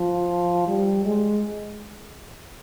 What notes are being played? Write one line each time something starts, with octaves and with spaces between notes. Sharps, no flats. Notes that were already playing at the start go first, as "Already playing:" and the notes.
Already playing: F3
G3
G#3